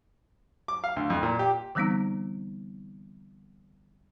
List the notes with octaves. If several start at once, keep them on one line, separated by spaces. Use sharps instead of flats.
D6
F5
D2
F2
A#2
G4
D3 E3 G3 B3 C4 D#4